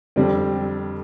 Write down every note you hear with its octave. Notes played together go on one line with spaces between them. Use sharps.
F2 D3 G3 C4